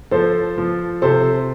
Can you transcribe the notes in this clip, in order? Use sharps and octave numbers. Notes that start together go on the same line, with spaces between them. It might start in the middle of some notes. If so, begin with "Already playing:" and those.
F3 A4 C5
F3
C3 A4 C5